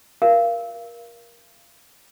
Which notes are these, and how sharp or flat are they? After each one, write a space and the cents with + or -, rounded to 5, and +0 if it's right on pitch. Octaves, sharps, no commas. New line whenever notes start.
A#4 +20 F5 -25